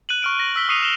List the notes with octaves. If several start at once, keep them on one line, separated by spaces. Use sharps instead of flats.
F#6 D#7 F#7
C#6 F6 D7
A#6
E6 B6 G7
C#6 D#6 C7 C#7 D#7 F7
F6 E7 F7 G7